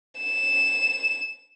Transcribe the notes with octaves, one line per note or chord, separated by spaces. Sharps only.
E7